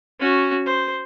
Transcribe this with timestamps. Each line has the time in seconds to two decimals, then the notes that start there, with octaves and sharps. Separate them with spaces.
0.20 C#4 F#4
0.66 C5